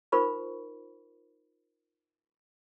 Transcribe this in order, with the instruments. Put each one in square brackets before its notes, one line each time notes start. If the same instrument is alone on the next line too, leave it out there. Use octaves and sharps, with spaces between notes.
[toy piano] D#4 F4 A#4 C5 B5 C#6